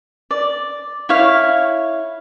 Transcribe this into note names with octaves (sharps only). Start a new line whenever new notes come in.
D5
E4 C#5 F5